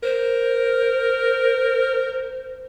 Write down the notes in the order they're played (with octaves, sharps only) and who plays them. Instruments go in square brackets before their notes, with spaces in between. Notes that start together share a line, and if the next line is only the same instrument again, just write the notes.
[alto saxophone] A#4 [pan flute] C5